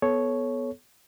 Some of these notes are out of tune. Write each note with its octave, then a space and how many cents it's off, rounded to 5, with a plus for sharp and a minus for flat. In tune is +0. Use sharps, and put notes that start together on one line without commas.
B3 +0 A4 -25 C#5 +0